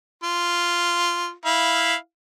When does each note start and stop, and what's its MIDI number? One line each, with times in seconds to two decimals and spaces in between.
0.24 1.32 65
1.45 1.95 64
1.45 1.95 77